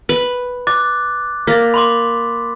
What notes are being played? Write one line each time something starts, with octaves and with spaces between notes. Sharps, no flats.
B4
D6 F#6 A6
A#3 A6 B6
B5 C6 D6